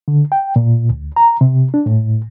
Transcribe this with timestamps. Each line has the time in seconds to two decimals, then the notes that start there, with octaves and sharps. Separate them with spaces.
0.08 D3
0.32 G5
0.56 A#2
0.90 D2
1.16 A#5
1.41 C3
1.74 D4
1.86 A2